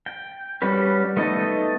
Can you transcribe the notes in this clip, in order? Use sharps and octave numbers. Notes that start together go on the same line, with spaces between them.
G5
G3 C#4 F#4 G4 B4
A3 B3 D#4 A4 D#5